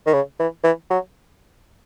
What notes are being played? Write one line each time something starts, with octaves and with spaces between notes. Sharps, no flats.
D#3
C#3
E3
E3
F#3